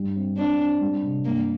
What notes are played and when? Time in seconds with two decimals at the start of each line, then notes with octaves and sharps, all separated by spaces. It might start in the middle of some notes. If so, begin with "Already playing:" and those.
Already playing: G2 G3
0.15 C4
0.37 C4 D4
0.59 C4
0.81 G3
1.03 C3
1.25 G2 A#3